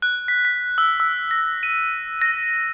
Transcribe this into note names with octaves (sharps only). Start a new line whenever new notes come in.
F#6
B6
B6
E6
E6
A#6
D#7
A#6